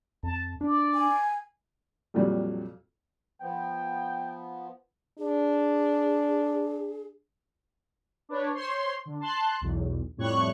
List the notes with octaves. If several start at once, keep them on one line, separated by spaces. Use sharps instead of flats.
F2 A5
D4 D5
G#5
F2 A#2 F#3 G3
F3 B3 G5
D4 G#4
D4 B4 C#5
C5 C#5 C6
D3
A5 C6 F#6
B1 E2
F2 A2 G3 C#5 C#6 F#6